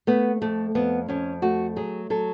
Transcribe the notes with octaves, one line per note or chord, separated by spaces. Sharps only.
A3 B3
F2 A3
F2 B3
F2 C#4
A3 F#4
F#3 G#4
F#3 A4